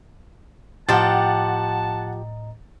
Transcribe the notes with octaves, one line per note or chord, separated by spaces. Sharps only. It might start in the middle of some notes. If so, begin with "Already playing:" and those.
A2 F3 G4 D#5 F#5 A5 A#5 A6